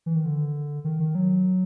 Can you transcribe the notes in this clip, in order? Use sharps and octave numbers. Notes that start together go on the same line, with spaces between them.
E3
D#3
D3
D#3
D#3
F#3